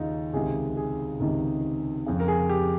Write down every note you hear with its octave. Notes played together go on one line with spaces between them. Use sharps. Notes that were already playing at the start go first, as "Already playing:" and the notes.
Already playing: D#2 C#3 D#4 F4
C#2 C3 D#3 G#4
G#4
C#2 C3 D#3
F2 C#3
A#4
G#4
G4